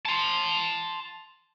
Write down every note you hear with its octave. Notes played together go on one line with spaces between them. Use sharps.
A5 C6